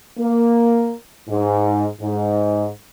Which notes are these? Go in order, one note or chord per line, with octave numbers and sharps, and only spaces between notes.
A#3
G#2
G#2